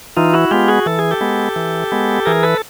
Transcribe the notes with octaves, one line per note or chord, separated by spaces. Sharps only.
E3 D#4 F4
E4 F#4
G#3 B3 F4 G4
F#4 G#4
E3 A4
G#4
G4 A4
G#3 B3
E3
G#3 B3
E3 G#4 A#4
A4 B4